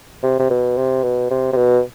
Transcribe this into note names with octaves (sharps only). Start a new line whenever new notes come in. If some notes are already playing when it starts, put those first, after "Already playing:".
C3
C3
B2
C3
B2
C3
C3
B2